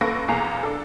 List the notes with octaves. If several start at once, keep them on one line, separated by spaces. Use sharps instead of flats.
A1 A#3 A4 B4 C#6 A#6
B1 E2 A#3 G#4 A#5
D4 A4